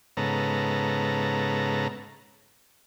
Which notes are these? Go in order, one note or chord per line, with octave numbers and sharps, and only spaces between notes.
G#2 C#3 B3 A4 A#5